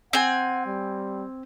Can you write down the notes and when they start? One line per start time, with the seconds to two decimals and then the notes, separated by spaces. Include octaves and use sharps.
0.13 C4 F#5 G#5
0.66 G3